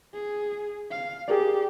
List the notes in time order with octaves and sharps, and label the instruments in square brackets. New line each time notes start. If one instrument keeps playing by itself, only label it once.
[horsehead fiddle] G#4
F5
[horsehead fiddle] G4 [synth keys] G#4 A#4 D5